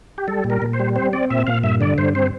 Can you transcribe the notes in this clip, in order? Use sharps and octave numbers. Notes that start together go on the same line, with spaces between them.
G4
G3 A4
A#2
A#4
A#2
C5
G3
C4 C5
C4 D5
A#2 E5
A#2 F5
G2 E5
D3 D5
G2 C5
C4 C5